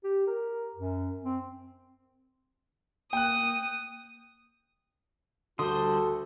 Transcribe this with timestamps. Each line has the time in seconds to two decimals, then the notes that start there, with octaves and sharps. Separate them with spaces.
0.04 G4
0.27 A#4
0.75 F#2
1.24 C4
3.13 A#3 G5 D#6 F#6
5.59 D2 D3 G3 F#4 A4 C5 C6 D#6